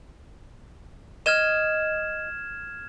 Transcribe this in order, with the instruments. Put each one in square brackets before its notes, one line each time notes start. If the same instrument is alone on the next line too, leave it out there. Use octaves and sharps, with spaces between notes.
[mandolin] D#5 [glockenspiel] F6 G#6 E7